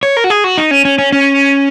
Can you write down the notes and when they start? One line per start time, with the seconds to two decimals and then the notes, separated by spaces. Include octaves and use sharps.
0.03 C#5
0.17 A#4
0.24 F#4
0.30 G#4
0.44 F#4
0.58 D#4
0.71 C#4
0.85 C#4
0.98 C#4
1.12 C#4